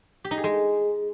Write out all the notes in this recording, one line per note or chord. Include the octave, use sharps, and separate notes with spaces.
G4
D#4
G#4
G#3